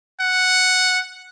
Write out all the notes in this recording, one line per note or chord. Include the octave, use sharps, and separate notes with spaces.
F#5